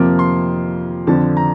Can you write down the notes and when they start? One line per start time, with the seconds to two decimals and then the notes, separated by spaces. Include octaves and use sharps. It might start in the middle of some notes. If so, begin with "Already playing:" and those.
Already playing: F2 C3 F3 A#3 D6
0.19 C6
1.07 F2 D3 F3 A5
1.37 A#5